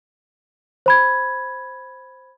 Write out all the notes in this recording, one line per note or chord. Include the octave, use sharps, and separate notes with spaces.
C5 B5 G#6